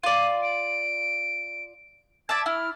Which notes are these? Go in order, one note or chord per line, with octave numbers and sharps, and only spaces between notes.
F4 D5 D#7
D7
D5 E5 A5 G#6
E4 F6